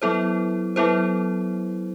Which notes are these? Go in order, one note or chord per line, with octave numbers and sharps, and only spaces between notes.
F#3 B3 E4 A4 C5
F#3 B3 E4 A4 C5